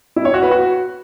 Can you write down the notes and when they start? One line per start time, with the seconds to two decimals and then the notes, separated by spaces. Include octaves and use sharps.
0.16 E4
0.25 C#5
0.34 F#4
0.43 B4
0.51 F#4